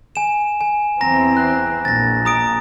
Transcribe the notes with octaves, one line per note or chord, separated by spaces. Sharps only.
G#5 E7
G#5
E2 E3 C4 A#5 A#6
F#6
A#1 A6 A#6
A#5 D#6 D7